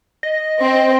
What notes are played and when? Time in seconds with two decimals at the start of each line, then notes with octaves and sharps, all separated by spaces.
0.23 D#5
0.61 C4